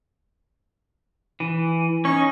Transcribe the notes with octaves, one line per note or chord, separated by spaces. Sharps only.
E3
C#4 D#4 C#6